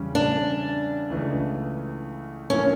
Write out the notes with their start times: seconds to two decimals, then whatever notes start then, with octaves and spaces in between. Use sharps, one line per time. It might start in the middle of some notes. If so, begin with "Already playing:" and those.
Already playing: E2 C#3 G3 C#4
0.15 D4
1.10 C#2 C#3 E3 A3
2.50 G2 F3 A#3 C#4 E4